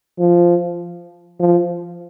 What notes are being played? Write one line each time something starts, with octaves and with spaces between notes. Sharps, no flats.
F3
F3